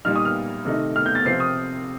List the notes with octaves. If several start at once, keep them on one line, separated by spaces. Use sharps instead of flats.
A#2 G3 A#3 D#4 F6
D#6
F6
C3 D#3 A3 D#4
F6
G6
A6
C3 F3 C4 F4 C7
D#6